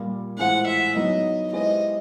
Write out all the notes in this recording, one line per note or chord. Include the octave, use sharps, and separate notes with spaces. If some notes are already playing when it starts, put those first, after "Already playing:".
Already playing: A#2 G3 A#3
A2 E3 G#3 C4 F4 F#5
E5
F#3 B3 D#4 D#5
G#3 C4 E4 G4 B4 D#5